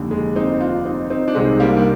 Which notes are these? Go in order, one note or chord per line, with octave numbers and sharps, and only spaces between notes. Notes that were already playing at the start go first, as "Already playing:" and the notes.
Already playing: F1 D#2 D3
G#3
C4 D#4
D4 F4
C4 D#4
C4 D#4
D4
C2 C3 D#3 G#3 C4
G3 A#3
D4